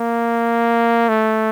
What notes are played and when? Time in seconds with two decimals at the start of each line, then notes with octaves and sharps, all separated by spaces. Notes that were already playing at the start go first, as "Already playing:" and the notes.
Already playing: A#3
1.09 A3